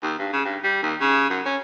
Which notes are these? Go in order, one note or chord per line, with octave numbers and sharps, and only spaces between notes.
D#2
G2
C#3
G2
G3
D#2
C#3
F#2
C#4